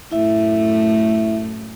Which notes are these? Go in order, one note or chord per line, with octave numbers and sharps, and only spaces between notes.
F#2 A2 A3 E4 E5